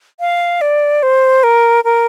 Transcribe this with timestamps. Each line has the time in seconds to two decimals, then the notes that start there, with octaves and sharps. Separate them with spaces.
0.20 F5
0.61 D5
1.03 C5
1.43 A#4
1.84 A#4